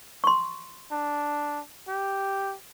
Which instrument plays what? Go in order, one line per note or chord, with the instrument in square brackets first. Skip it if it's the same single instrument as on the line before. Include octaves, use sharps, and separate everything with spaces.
[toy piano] C6 C#6
[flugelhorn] D4
G4